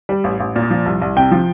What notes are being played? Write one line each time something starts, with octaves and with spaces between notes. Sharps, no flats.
G3
A1
A1
A#2
F3
C2
C2
C3 G5
F3